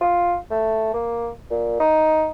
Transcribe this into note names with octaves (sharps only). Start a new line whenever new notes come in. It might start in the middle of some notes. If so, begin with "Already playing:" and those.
F4
A3
A#3
A#2
D#4